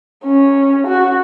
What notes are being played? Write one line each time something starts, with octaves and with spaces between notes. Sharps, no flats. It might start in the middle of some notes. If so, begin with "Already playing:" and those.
C#4
F#4